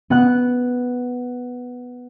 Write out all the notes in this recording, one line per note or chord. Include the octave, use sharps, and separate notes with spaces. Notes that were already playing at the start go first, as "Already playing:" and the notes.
B3 F#5 F#6